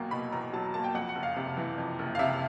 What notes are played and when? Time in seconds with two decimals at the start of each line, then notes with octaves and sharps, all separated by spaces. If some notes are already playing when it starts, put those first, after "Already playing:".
Already playing: E2 B2 F#3 A#3 G5
0.11 B2 B5
0.32 E2 A#5
0.53 F#3 A5
0.64 A#5
0.74 A#3 A5
0.84 G5
0.94 F2 F#5
1.09 F#5
1.15 F#1
1.23 F5
1.36 C3
1.57 E3
1.78 F2
1.99 F#1
2.15 F5
2.19 C3 E5